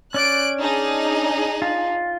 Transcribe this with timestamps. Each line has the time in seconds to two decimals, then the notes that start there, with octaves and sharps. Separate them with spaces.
0.14 C#4 D5 F#6 D7
0.59 D4 D#4 G#4
1.62 F4